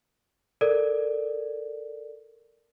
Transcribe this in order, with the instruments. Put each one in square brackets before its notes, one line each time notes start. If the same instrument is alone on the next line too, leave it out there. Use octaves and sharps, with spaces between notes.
[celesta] A4 A#4 D5